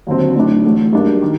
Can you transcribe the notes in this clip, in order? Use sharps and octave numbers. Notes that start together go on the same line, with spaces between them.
D#2 D3 F#3 C4
A2 F#3 A3 D4
A1 A2 A3
G2 F#3 A#3 D4
D#3